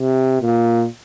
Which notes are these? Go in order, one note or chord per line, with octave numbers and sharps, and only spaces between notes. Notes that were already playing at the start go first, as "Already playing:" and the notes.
Already playing: C3
A#2